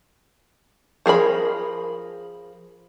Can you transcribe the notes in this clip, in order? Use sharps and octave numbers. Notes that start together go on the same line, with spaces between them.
F3 G#4 A#4 B5